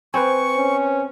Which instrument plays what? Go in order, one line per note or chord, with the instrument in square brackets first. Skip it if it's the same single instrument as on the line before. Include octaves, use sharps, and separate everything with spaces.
[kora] C4 [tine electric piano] B4 C5 G#5 [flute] C#6
[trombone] C#4